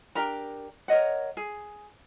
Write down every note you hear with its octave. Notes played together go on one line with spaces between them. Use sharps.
D4 G4 A#4 A#5
A#4 C#5 D#5 F#5
G#4